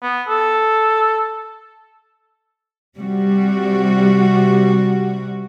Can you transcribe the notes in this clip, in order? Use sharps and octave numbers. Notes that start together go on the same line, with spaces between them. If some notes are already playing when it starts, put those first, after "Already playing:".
B3
A4
C3 G3 F#4